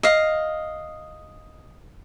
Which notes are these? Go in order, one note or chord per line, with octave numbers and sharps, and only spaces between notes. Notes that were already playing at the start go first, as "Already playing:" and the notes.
D#5 F5